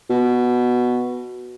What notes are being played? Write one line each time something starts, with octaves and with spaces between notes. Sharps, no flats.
B2